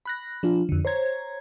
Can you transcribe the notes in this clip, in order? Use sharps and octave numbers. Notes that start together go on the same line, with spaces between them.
B5 F#6 A#6
F3 D4 F4
F2 D3
C5 C#5 A#5 G#6